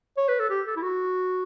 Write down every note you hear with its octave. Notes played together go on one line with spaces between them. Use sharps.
C#5
B4
A4
G4
A4
E4
F#4